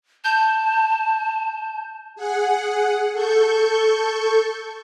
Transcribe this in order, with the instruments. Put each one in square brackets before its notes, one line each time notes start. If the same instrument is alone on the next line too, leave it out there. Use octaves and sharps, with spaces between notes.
[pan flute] A5 [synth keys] G6
[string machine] G#4 F#5
A4 C#6 G6